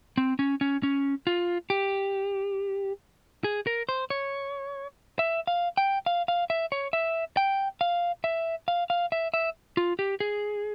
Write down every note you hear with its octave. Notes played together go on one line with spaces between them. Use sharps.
C4
C#4
C#4
C#4
F4
G4
G#4
A#4
C5
C#5
E5
F5
G5
F5
F5
E5
C#5
E5
G5
F5
E5
F5
F5
E5
E5
F4
G4
G#4